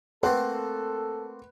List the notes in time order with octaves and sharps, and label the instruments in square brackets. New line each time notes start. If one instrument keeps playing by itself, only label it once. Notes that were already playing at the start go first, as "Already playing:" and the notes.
[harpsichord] A3 A#3 C4 [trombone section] A4 [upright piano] B4 [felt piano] F#5 C6 F#6